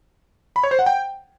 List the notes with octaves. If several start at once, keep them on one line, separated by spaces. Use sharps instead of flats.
B5
C#5
C5
F#5
G5